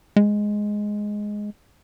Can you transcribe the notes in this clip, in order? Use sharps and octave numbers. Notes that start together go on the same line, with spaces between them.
G#3